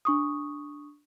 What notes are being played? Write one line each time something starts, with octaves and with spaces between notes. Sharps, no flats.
D4 C#6 D#6